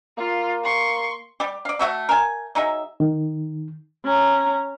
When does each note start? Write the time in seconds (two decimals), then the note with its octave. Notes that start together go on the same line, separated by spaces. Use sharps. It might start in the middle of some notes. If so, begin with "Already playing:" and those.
0.18 A#3 F4
0.64 C6 C#6
1.40 G3 G4
1.65 D5 F5
1.79 A3 F#4 E5 F#5
2.09 A#4 G#5
2.55 F#3 D#4 G#4 E5
3.00 D#3
4.04 C#4 A#5